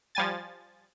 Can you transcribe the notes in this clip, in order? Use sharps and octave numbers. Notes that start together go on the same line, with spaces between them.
F3 G3 G#5 A6